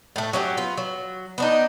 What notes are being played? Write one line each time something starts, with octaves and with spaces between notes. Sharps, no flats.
A2 A3
F#3 C#4 D#4 G4
B3 F4
F#3
B3 D4 D#4